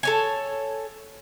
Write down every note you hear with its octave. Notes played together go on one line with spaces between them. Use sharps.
A4 C#5 G#5